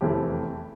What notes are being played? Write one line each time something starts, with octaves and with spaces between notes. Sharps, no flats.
F1 E2 E3 A3 C4 G4